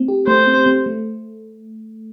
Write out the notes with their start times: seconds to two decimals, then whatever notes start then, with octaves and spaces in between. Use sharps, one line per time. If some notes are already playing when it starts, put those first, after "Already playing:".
Already playing: A3 C4
0.08 G4
0.27 A3 C5
0.47 C4
0.66 C4
0.86 A3